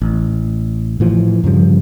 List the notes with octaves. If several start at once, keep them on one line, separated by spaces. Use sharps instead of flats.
A1
A2 E3 F3
G2 C#3 F3 G3